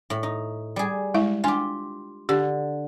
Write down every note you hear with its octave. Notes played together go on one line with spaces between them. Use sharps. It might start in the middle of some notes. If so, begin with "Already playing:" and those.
A2
D#4
G3 G#4
G#3 E4 E5
D4 F4 G4 G#5
D3 G4